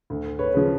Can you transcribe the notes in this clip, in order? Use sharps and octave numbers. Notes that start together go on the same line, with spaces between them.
D2
B4 C#5
C#3 F3